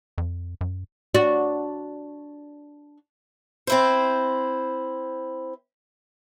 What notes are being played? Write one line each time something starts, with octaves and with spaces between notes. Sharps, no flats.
F2
F#2
D4 F#4
C4 E4 C5